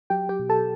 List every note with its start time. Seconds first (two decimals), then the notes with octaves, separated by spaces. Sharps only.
0.10 F#3 G4 G5
0.29 G4 G5
0.39 B2
0.49 A4 A5